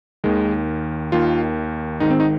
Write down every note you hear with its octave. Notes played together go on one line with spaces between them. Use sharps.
D#2 D#3 G#3
D#2 D#3 F4
G#1 G#2 D#3 D#4
C4
D#4